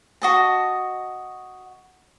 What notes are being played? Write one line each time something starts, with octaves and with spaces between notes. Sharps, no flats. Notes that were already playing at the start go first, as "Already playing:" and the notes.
F#4 D#5 A5